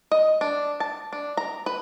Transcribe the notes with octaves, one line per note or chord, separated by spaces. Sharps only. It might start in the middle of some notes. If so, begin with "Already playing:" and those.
D#5
D4
A5
D4
A#5
B4